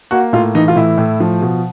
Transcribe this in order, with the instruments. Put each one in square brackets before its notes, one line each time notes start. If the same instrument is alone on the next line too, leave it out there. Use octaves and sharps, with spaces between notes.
[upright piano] A#3 F#4
A2 F4
E3 D#4
F4
A2 E4
A2
F3
B2